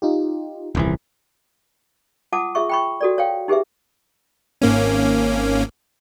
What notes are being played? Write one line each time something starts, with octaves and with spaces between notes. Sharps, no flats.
D#4 F4 G4
D#1 C2 E3
F4 F#5 A5 D6 D#6
F4 G#4 E5 C#6
G5 B5 C#6
F#4 A4 D5
C#5 F5 G5
D#4 G4 G#4 B4 E5
G#1 A#3 C#4